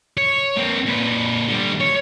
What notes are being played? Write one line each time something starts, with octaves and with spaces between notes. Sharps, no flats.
C#5
A#3 C4
A#2 B4
D3 G3
C#5